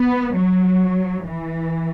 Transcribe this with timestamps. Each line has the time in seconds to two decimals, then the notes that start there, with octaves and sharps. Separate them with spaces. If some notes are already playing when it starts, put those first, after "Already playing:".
Already playing: B3
0.35 F#3
1.25 E3